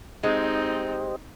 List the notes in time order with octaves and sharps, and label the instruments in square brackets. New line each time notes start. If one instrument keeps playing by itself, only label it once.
[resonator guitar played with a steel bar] G#3 [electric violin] C4 D#4 [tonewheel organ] G4 C5 D#5